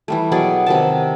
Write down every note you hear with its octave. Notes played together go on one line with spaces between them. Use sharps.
E3 G3 A3
B2 F#3 G#4 D5
C3 D#3 A5